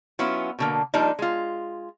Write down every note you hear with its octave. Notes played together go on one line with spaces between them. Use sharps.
F#3 B3 C#4 E4 F4
B2 D3 A#3
F3 G3 A#3 D4 D#4
G#3 F4